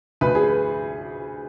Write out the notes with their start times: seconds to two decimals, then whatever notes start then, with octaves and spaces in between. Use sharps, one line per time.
0.21 D2 B4
0.35 G#4
0.48 B4